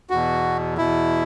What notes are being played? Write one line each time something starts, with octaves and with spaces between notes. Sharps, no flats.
E2 B2 F#4
E2 B2 E4